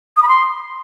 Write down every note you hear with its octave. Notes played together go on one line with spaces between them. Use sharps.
D#6
B5
C6